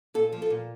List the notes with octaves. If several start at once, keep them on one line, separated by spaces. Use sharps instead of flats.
A#2 A4
F3
A4
A#2